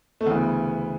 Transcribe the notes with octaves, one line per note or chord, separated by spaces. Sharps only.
A3
D2 C#3 E3 B3